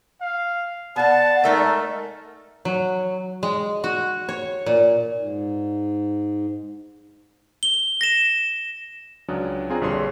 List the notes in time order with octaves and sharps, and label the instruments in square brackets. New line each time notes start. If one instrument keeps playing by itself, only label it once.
[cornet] F5
[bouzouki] B3 F5 [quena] D5 [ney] F#5 [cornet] A5
[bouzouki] G#3 D#4 E5 [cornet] A3 [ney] A#4
[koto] F#3
G#3
F#4
C#5
A#2
[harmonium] G#2
[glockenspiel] G7
A#6 E7
[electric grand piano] C#2 F#3 C#4 D4 D#6
C4 D4 F4 G#4 G#5 A#5
A#1 G2 D3 G#4 C#5 C6